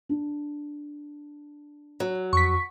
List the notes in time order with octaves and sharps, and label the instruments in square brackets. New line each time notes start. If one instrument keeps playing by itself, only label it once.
[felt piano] D4
[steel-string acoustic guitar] F#3
[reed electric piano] F2 [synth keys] C#6 B6